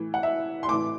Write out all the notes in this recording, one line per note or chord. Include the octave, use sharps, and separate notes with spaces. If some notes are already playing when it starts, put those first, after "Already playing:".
Already playing: A2 E3
F#5
E5
C6
A2 E3 D6